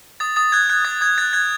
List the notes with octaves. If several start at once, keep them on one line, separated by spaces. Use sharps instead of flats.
D#6 A6
D#6 A6
F#6 G#6
F#6 G#6
D#6 A6
D#6 G#6
F#6 A6
F#6 G#6